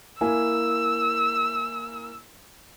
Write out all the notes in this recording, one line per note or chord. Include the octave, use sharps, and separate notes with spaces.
A#3 E4 G#5 E6